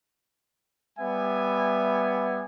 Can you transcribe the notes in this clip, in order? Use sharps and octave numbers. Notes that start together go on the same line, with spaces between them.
G3 B3 E5 G#5